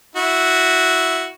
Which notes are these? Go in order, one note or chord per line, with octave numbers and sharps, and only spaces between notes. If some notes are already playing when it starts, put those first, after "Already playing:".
E4 F#4